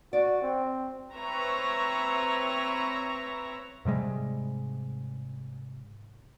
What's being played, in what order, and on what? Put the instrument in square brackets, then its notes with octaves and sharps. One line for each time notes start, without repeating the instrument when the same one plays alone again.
[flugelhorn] F#4 [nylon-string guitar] D5
[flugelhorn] C4
[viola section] C4 B4 C#5 E5 A#5
[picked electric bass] G#2 C3 G3 G#3